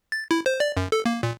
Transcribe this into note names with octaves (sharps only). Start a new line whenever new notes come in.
A6
E4
C5
D5
F#2
A4
A#3
A#2